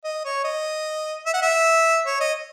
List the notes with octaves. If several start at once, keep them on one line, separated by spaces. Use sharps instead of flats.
D#5
C#5
D#5
E5
F#5
E5
C#5
D#5